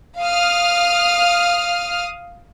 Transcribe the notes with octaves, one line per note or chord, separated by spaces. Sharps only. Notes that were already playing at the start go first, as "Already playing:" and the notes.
F5 D#6 F6